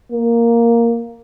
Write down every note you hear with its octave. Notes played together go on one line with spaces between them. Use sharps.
A#3